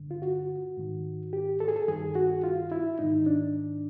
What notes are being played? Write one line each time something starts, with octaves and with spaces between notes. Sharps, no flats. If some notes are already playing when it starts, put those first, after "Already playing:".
Already playing: G2 D3
F4
F#4
G#2 D#3
G4
A4
G#4
A4
G2 D#3 G#4
F#4
F4
E4
G#2 D#3 D#4
D4